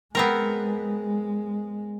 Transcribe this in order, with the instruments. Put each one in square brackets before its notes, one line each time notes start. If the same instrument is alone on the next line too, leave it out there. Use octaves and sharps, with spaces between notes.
[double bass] G#3 [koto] B3 C4 A#4